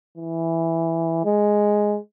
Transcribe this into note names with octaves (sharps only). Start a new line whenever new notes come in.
E3
G#3